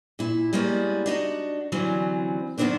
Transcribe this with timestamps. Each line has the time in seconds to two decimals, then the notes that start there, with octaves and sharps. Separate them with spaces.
0.19 A#2 E4
0.53 G3 G#3 A#3 B3 C#4 E4
1.06 D4 D#4 F#4
1.72 D3 E3 F#3 G3 C4 C#4
2.58 F#2 D#3 B3 C4 D4 C5